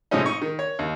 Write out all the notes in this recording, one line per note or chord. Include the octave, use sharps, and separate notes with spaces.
A2 C3 F3 G#3 C#4 D#4
D#4 C#6
D#3
C#5
D#2